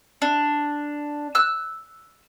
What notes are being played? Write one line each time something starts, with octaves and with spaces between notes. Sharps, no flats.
D4
E6 F#6